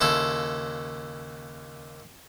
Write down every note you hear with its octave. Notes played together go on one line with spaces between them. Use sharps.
D#2 C#3 E4 F4 A4